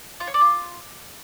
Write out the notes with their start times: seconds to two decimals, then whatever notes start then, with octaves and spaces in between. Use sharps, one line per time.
0.20 F4
0.27 C#5
0.34 D5
0.41 F4